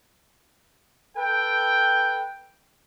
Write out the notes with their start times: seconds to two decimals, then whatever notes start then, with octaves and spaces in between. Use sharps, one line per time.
1.16 A4 B4 G5